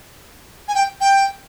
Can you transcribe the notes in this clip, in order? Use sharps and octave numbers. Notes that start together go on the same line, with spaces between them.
G#5
G5
G5